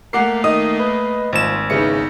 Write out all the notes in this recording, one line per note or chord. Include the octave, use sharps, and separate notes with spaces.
A3 A#3 A#4 F#5 D6 C7
D#3 D#5 D#6
B4
G#1 F3 E7
C#3 E3 B3 D#4 C#7